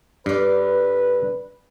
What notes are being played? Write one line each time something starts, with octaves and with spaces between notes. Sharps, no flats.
G2 D3 B4 D5